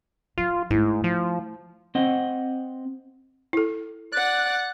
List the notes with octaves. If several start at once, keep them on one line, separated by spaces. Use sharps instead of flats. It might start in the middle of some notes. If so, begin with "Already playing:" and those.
F3 F4
G#2 A3 E4
F3
C4 D#5 F#5
E4 A4
D5 F#5 F#6 A6